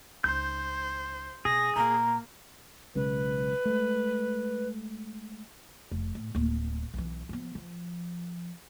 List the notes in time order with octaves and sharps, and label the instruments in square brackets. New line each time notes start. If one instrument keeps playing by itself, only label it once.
[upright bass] C#2 D#4 [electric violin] C5 [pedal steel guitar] G6
[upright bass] B2 [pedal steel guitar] G#4 [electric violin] A#6
[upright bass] A#2 [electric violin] A#3 [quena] A#5
[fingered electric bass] B1 C#3 G#3 [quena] B4
[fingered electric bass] G#3 A3
[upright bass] F1
A2
D1 A#3
B1 E3
F3 B3
F3